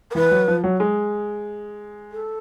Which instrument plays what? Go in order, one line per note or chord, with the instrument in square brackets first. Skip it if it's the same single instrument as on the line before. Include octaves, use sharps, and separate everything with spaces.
[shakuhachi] A#4
[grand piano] E3 [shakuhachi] B4
[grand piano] F#3
F3
F#3
G#3
[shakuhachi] A4